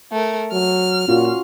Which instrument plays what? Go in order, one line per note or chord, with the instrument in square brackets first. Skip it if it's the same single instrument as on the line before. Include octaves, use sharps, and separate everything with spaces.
[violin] A3 A#4
[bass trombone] F#3 [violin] F6
[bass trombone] A#2 [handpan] C#4 F4 F#4